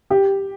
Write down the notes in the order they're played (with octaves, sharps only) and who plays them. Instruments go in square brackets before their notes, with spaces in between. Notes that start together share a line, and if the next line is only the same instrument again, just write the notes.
[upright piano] G4